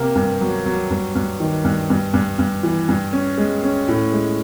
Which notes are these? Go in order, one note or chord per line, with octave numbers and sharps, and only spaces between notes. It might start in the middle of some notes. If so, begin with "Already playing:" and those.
Already playing: C3 A#3
G2
F#3
F#3
G2
G2
D#3
G2
G2
G2
G2
E3
G2
C#4
G#3
C#4
A2
G#3